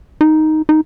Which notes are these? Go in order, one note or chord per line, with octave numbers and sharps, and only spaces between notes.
D#4
D#4